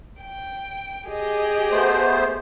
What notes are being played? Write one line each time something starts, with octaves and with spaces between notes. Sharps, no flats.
G5
G4 G#4 D#5
A3 B3 C5